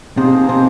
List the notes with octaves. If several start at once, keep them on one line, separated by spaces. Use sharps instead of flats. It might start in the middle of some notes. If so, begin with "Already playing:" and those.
C3 F3 A#3 C4 D#4 G#4 C5
C3 C4